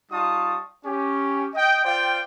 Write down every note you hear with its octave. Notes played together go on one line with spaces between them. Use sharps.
G3 D#4 F4 A5 C#6 D#6
C#4 G4
D#5 G5
F4 C5 D5 F5 G5